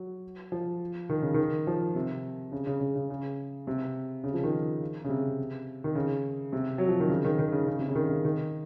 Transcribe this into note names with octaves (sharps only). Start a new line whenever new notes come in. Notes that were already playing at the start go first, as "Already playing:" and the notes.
Already playing: F#3
F3
D#3
C#3
D#3
F3
C3
C#3
C#3
C#3
C#3
C#3
C3
C#3
F3
D#3
C#3
C3
D#3
C#3
C3
F#3
F3
D#3
C#3
D#3
D#3
C#3
C#3
C3
C#3
D#3
C#3
D#3